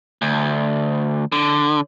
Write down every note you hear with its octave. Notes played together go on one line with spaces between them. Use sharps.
D2
D3